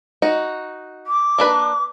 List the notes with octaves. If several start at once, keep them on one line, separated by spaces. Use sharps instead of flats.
D#4 F#4
D6
A#3 D4 B4